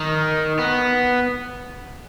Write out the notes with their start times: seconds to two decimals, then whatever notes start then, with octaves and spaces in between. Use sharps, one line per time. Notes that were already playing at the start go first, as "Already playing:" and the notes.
Already playing: D#3
0.59 B3